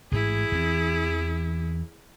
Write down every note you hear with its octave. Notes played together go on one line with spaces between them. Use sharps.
A1 G#2 E4 G#4
E2 E3 C4